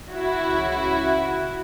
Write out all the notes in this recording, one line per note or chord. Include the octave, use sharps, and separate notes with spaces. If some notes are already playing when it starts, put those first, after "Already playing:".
E4 F#4
C#2 C#3 E3